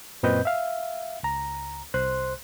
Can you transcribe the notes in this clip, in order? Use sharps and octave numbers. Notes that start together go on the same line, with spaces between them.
F#2 A#2 C4 B4 D#5 G6
E5 F5
C#2 A#5
C2 C5 C6 F#6